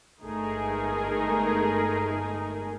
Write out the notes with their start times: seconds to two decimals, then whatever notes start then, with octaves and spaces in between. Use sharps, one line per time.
0.22 G1 G#3 A3 D#4 G#4 A#4